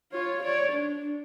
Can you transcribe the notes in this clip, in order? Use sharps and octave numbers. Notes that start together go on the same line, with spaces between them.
F4 C#5
C#5 D5
D4